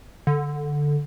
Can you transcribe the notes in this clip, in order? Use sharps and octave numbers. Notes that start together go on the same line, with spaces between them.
D3